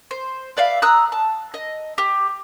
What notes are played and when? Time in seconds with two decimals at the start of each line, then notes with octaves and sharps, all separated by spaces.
0.11 C5
0.57 B4 D5 E5 F5
0.82 A#5 D#6 E6 F#6
1.12 A5
1.54 D#5
1.98 G4